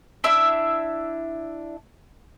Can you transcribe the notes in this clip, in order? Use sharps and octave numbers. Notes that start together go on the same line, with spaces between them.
D4 E4 E5 E6